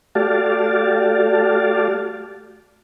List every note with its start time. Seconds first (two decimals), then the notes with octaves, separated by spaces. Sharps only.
0.15 A3 F#4 G4 D5 F5 A5